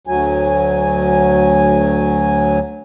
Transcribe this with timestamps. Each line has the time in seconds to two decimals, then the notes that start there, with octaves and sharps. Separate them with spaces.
0.07 D2 F#3 G#5